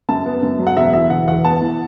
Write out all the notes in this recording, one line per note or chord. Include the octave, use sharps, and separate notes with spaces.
F#2 A5
B3
F#2
F#3
F#5
E1 E5
E3 E5
E1 F#5
E2 F#5
B3 A5
E3